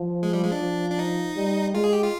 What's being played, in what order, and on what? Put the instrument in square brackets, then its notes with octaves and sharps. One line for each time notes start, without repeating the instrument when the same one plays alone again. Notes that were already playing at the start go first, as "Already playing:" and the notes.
Already playing: [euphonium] F3
[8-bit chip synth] G#3
G3
G#3
D4
[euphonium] F3
[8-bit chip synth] D4
D#4
[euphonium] G3
[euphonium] G#3 [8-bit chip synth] F4
[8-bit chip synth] G#4
G4
F4